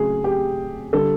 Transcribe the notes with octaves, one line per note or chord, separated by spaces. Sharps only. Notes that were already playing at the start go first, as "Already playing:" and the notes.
Already playing: C#3 F#3 A3 G#4
G4
D3 G3 A4